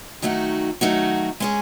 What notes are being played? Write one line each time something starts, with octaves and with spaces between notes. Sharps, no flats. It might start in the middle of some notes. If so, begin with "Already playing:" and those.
D#3 F#3 A3 D#4 F#4
D#3 F#3 A3 D#4 F#4
G#3 C#4 G#4